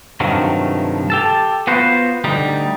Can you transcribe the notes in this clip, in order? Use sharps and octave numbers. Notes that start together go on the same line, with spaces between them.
G2 C3 D#3 F3 F#3 A3
G4 A4 A5
B3 F4 F#4 B4 C5
D2 G3 D#4